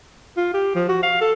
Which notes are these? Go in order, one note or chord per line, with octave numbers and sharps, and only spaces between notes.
F4
G4
F3
F#4
F5
A4